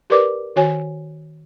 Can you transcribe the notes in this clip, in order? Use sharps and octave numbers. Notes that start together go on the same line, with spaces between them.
G4 A#4 B4 D5 D6
D#3 F#4 C#5 G#5